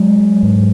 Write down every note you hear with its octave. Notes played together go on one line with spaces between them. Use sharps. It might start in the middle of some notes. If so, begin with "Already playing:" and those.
Already playing: F#3 G#3
G#2